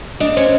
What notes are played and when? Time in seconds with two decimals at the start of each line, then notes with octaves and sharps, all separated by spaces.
0.20 D4 D#5
0.37 C#4 C5